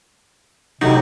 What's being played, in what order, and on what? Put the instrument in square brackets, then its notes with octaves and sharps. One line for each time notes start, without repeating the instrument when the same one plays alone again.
[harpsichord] A2 F#3 [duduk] C3 [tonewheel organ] D#4